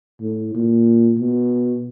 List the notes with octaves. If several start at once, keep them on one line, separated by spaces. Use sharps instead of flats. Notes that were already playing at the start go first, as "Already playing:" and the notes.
A2
A#2
B2